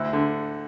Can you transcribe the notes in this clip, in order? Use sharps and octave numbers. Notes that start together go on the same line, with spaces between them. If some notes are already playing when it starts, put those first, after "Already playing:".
Already playing: D2 E4
D3